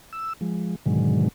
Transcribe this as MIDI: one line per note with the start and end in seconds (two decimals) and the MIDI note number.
0.13 0.33 88
0.41 0.76 53
0.41 0.76 56
0.86 1.28 44
0.86 1.28 47
0.86 1.28 50
0.86 1.28 51
0.86 1.28 54
0.86 1.28 56